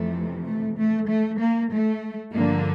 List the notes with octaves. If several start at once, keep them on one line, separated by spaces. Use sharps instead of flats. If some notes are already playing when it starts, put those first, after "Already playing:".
Already playing: F2 C3 E3 A3
A3
A3
A3
A#3
A3
G2 D3 F3 A#3